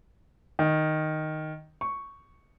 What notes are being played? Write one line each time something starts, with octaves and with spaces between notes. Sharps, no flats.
D#3
C#6